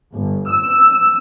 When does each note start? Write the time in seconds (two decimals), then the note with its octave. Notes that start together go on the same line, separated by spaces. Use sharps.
0.14 G1
0.51 E6